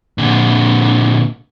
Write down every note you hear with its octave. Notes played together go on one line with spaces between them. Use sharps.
A#2 D3